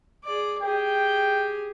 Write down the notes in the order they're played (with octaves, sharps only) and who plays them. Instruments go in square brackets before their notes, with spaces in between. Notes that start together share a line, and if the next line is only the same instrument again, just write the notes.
[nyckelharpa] G#4 D5
[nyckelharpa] G4 G#4 [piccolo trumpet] G5